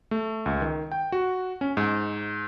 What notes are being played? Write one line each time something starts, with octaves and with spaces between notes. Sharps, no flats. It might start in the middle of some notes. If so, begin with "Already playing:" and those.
A3
C#2
D#3
G5
F#4
C#4
G#2